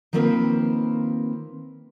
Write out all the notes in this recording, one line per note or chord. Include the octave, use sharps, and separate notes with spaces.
D#3 F3 A#3 C4 A#4 B4